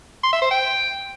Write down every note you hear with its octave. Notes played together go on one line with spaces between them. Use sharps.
C6
E5
C5
G5